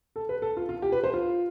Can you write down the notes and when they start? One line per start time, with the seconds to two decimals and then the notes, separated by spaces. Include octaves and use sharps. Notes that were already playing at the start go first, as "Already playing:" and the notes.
0.16 A4
0.29 B4
0.42 A4
0.57 F4
0.69 F4
0.82 G4
0.92 B4
1.04 C5
1.14 F4